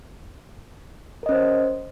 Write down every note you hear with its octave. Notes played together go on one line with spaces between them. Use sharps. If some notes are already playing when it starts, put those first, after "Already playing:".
C#4 A#4 C5 D#5